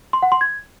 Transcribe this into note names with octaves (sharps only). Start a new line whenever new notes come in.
C6
F#5
C6
G#6